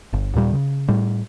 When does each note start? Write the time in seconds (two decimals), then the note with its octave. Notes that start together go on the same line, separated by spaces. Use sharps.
0.13 G1
0.35 D#2 A#2 G3
0.53 C#3
0.88 A2 G3